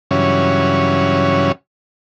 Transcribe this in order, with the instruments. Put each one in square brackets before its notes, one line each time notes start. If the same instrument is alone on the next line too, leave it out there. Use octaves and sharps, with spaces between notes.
[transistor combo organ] G2 C#3 E3 F#3 C#4